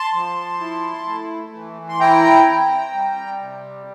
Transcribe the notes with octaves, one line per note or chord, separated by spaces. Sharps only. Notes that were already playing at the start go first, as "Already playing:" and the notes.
Already playing: A5 C6
F3
E4
A3
E3
C6
E4 G5 A#5
C4
G3
C3